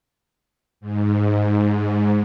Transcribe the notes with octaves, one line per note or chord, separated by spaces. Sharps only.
G#2